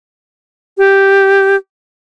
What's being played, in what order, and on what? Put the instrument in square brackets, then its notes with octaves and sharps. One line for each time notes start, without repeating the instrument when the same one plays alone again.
[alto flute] G4